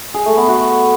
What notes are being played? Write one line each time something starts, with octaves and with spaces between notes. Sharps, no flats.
G#4
A3
B3
F#4